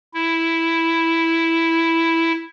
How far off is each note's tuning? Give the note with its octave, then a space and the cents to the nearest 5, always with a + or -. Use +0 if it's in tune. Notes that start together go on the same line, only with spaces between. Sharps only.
E4 +0